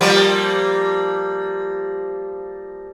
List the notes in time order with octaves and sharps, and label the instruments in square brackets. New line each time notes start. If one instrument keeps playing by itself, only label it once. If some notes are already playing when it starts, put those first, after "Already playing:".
[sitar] F3 G3 A#3